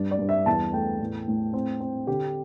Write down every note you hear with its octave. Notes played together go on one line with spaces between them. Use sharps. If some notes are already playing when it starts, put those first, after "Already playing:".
Already playing: G2 D4 D5
D5
G2
E5
E2 A5
A3 G5
A2
A2
C4
C4
D3 G4